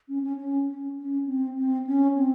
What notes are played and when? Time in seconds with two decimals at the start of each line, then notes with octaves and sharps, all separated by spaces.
0.08 C#4
0.22 C#4
0.37 C#4
0.68 C#4
0.97 C#4
1.26 C4
1.57 C4
1.87 C#4
2.16 C4